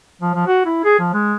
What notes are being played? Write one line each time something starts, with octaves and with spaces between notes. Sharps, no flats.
F3
F3
F#4
E4
G#4
F3
G#3